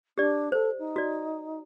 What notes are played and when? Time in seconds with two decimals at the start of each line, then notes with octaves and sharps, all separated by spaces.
0.18 D4 G4 D5
0.52 A4 C5
0.78 D#4
0.96 F#4 D5